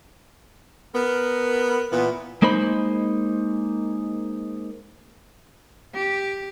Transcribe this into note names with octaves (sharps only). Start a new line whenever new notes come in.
B3 A#4
A#2 E3 B3
G#3 A#3 D#4 C5 B5
G4